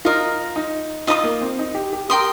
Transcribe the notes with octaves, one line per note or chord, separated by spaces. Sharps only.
D#4 F4 A#4 D#5
D#4
D#4 F4 D#5 A#5 D#6
A#3
C4
D#4
G4
G4
G4 A#4 G5 C6 D#6